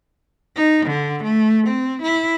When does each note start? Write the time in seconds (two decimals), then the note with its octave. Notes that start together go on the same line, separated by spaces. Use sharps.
0.56 D#4
0.86 D3
1.23 A3
1.67 C4
2.02 E4